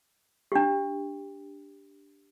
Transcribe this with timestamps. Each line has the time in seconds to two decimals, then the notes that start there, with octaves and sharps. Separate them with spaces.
0.52 D4 G4